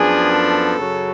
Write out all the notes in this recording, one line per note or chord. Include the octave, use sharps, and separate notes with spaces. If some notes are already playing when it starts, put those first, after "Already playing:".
Already playing: F#2 F3 B3 D4 G#4
A4
F#2 C#3 F#3